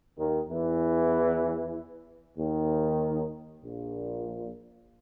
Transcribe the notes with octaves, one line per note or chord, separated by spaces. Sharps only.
D#2 D#3
E2 E3
D#2 D#3
A#1 A#2